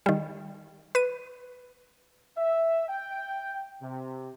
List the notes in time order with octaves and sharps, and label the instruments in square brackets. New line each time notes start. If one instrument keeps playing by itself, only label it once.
[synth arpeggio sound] D#3 G3
B4 D#7
[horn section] E5
G5
C3